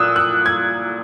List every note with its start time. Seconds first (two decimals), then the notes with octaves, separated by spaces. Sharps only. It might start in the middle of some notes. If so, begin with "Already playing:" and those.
Already playing: A#2 D#6 E6 F#6
0.16 F#6
0.46 G#6